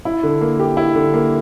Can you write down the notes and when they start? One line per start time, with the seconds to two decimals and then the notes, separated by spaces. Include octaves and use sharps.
0.05 E4
0.23 D3
0.41 A#3
0.60 G4
0.77 E4
0.95 D3
1.14 A#3